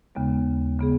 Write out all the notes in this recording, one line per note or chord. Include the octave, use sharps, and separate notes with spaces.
D#2 C#3 G#3 B3
C#3 B3 G#4